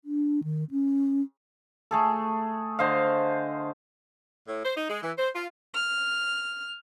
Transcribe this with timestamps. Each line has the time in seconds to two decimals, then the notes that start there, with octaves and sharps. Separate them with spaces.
0.05 D4
0.43 D#3
0.71 C#4
1.91 A3 G#4 A4
2.79 D3 C5 D#5 F5
4.47 A2
4.65 C5
4.76 D#4
4.89 G#3
5.02 E3
5.18 C5
5.34 F4
5.74 F6